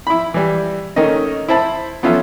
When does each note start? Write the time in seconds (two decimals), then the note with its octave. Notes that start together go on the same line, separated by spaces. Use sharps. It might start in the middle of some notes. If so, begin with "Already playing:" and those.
0.07 E4 B5
0.34 E3 G3
0.96 D#3 A3 A#3 C#4 D#5
1.49 E4 C5 A5 B5
2.03 B3 C#4 F4 A4 E5